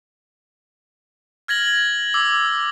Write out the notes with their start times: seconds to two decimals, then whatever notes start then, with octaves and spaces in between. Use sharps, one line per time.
1.48 F6 G#6 A#6 F#7
2.14 D6 E6